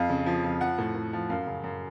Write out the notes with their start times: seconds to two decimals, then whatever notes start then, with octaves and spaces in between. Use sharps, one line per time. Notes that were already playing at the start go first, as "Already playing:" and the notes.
Already playing: F2 F5
0.09 C#3
0.26 F3
0.44 F2
0.61 F3 F#5
0.78 A2
0.95 A2
1.13 F3
1.30 F#2 F5
1.47 C#3
1.64 F#2